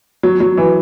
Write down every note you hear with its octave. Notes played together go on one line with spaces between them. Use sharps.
F#3
F#3
E3